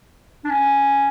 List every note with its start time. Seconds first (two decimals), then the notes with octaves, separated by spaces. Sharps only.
0.45 D4
0.50 C#4